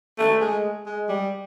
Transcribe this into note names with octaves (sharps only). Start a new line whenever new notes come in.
A3
G#3
G#3
G3